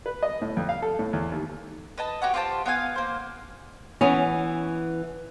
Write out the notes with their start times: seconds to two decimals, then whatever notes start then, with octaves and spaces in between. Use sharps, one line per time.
0.06 B4
0.23 D#5
0.42 A2
0.57 F2
0.69 F5
0.82 A4
0.99 A2
1.13 E2
1.32 D#2
1.98 B4 D#5 A5
2.22 F#4 G4 C#5 F#5
2.34 F4 G4 C5 A5
2.66 B3 F4 F5 G#5
2.96 A#3 C5
4.01 E3 B3 C#4